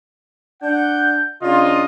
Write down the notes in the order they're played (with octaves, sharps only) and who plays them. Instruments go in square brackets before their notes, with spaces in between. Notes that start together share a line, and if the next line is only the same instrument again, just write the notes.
[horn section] D4 F#5 [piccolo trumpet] G6
[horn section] C#3 D4 F4 [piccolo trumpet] D#5